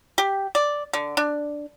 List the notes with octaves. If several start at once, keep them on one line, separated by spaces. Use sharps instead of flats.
G4
D5
D3
D4